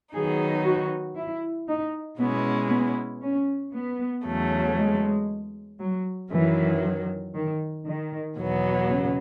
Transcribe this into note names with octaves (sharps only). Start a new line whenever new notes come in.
D#3 F#3 B3 D#4 G#4
F#4
E4
D#4
B2 G#3 B3 C#4 E4
B3
C#4
B3
E2 C#3 F#3 A3
G#3
F#3
F#2 D#3 E3 F#3
D#3
D#3
E2 B2 F#3 B3
C#3